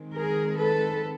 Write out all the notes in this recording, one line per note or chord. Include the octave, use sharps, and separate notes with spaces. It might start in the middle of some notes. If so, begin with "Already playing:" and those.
Already playing: D#3 G#3 C4
G#4 A#4
A4 B4